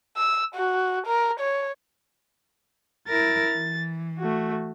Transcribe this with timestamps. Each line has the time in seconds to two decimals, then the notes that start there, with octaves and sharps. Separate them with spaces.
0.17 E6
0.55 F#4
1.07 A#4
1.40 C#5
3.09 E4 A#4 A6
3.54 E3
4.19 A3 F#4